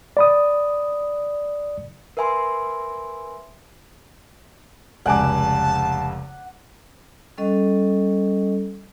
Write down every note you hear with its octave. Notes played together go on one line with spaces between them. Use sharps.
D5 B5 D#6
A#4 B4 E5 G#5 B5 C6
F1 C#2 D5 F#5 G#5 A5 D6
G3 C#4 A4 D#5